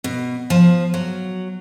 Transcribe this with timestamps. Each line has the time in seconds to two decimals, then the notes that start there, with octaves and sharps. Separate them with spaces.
0.04 B2
0.50 F3
0.94 F#3